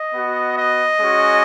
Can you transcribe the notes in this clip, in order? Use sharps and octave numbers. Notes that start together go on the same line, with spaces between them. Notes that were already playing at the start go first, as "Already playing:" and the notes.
Already playing: D#5
B3 F#4
D#5
G#3 C#4 F#4